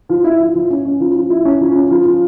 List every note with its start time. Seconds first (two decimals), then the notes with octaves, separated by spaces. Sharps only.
0.09 F3
0.24 E4
0.40 F3
0.55 F3
0.70 C#4
0.85 C#4
1.00 F3
1.15 F3
1.30 E4
1.45 C#4
1.61 F3
1.75 C#4
1.90 F3
2.06 F3